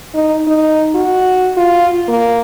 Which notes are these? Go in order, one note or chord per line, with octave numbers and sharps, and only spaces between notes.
D#4
D#4
F#4
F4
A#3